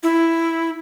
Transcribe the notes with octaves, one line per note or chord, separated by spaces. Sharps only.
E4